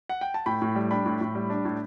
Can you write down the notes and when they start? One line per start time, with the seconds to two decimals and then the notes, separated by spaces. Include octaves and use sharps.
0.09 F#5
0.21 G5
0.34 A5
0.46 A2 G5 B5
0.62 A2
0.75 G3
0.91 D4 G5 B5
1.06 A2
1.21 A2
1.35 G3
1.50 D4
1.65 A2